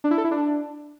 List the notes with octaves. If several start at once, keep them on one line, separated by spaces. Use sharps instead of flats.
D4
E4
A4
E4
D4